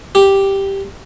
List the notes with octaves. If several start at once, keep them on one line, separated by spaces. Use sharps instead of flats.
G4